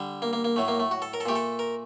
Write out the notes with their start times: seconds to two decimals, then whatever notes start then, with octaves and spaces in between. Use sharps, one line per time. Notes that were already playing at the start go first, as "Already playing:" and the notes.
Already playing: D3 G3
0.22 A#3
0.33 A#3
0.44 A#3
0.56 A2 F#3 A3
0.68 A#3
0.80 A3
0.91 F#4
1.02 A4
1.14 A#4
1.20 A4
1.26 A#2 A3 G4
1.35 A4
1.59 A#4